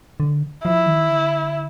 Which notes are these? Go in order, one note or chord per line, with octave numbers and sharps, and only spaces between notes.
D3
F3 E4
D#3
D3